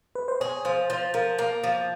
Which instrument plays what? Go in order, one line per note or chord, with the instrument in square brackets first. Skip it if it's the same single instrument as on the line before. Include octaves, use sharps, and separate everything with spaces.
[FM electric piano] B4
C5
[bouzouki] G#4 [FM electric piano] C#5
[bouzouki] F3 [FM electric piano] C5
[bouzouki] F3 [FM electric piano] C5
[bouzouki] F3 [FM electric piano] A#4
[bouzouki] A#3 [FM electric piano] A#4
[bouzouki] F3